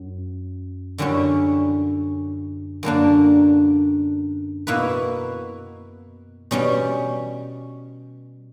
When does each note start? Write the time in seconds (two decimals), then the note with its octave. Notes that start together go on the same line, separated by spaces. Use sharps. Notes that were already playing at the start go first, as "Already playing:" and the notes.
Already playing: F#2
0.98 F#2 D3 G3 C#4 E4
2.83 F#2 D3 A#3 D4
4.67 B2 A#3 E4 B4
6.51 B2 G3 C#4 G4